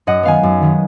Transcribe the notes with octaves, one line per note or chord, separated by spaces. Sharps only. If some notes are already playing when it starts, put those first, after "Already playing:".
F#2 D#5 F#5
D#3 G#3 B3 F5 G#5
F#2
D#3 G#3 B3